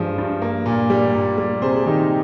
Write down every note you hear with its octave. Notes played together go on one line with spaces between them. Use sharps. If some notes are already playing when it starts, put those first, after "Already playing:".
Already playing: G2 F3 G#3 G#4 C5
G2
A#3
A#2
G3
A#2
G3
C3 G#4 C5
G#4
D#3 D#4 G4